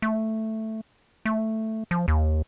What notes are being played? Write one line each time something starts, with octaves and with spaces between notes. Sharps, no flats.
A3
A3
F3
D#2